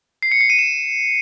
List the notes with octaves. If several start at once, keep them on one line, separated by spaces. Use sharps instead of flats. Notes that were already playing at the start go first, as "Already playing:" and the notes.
C7
C#7
C7
D#7
E7